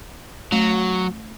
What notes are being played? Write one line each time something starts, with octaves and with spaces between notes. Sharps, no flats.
F#3 A3